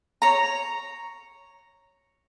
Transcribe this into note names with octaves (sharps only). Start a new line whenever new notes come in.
C#5 A#5